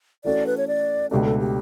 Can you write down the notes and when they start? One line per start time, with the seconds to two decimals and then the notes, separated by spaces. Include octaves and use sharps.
0.24 E3 A3 C#4 F#4 A4 D5
0.46 B4
0.57 C#5
0.68 D5
1.11 C#2 B2 A3 D4 G4
1.25 A4
1.38 G4